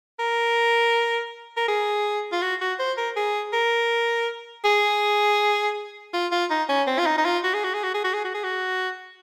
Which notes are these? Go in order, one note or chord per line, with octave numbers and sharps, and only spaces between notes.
A#4
A#4
G#4
F4
F#4
F#4
C5
A#4
G#4
A#4
G#4
F4
F4
D#4
C#4
C4
F4
D#4
D#4
F4
F#4
G#4
F#4
G#4
F#4
G#4
F#4
G#4
F#4
G#4
F#4